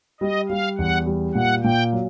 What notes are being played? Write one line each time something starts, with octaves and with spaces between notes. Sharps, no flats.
G3 D#5
G3 F5
E2 F#5
G3
A#2 F#5
A#2 G5
F#3